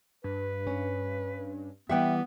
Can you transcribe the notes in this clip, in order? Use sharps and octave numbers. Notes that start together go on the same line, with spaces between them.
G2 B4
C#4
E3 G3 B3 G4 E5 F#5 G5